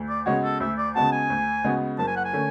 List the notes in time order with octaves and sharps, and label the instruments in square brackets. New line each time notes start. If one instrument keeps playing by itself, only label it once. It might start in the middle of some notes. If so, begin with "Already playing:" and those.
Already playing: [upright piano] D2
[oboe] D5
[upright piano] C#3 G#3 B3 F#4 [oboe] C#5
[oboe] A4
[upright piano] D2 [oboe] E5
[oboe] D5
[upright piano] C#3 G#3 B3 F#4 [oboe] A5
[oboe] G#5
[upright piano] D2
C#3 G#3 B3 F#4
[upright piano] F#1 [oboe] A5
[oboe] G#5
F#5
G#5
[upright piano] D3 A3 C#4